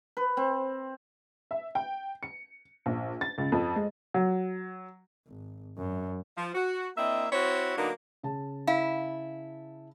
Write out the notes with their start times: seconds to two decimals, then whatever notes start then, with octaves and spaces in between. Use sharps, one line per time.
0.17 B4
0.37 C4
1.51 E5
1.75 G5
2.23 C#7
2.86 A#1
3.21 A6
3.38 C#2
3.52 F2
3.76 G#3
4.14 F#3
5.27 G#1
5.78 F#2
6.38 F3
6.55 F#4
6.97 A#3 C4 D4 E4 D#5 E5
7.32 C4 E4 F#4 C#5
7.77 D3 F#3 A#3 B3 D4 D#4
8.23 C#3 A5
8.67 E4 F5